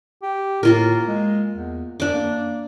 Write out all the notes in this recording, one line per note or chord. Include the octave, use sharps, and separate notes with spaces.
G4
A2 A#3 F4 A#4
G#3
E2
F#2 D4 D6
A#3